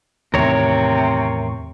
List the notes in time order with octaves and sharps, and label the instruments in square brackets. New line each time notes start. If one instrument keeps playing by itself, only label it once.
[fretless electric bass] E2 A2 D#3 [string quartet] C3 [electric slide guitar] A#4 C#5